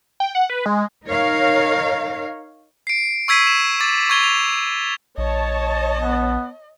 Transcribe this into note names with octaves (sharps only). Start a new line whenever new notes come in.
G5
F#5
B4
G#3
D#4 A#4 C#5 F5
C7 D7
C#6 E6 G#6 B6 C7 D#7
E7
D6 A6
C#6 D6 G#6 F7 G7
F7
A#1 C#5 D#5 A5
B3